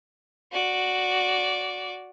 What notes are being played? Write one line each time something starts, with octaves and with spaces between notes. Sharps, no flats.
F#4 D5